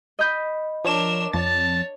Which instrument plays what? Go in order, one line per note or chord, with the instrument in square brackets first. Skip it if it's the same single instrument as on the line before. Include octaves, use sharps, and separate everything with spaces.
[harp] D#5 B5 G6
[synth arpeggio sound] F3 C#5 E7 [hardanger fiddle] D4 A#4
[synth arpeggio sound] F2 A6 [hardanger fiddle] C#5 [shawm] A5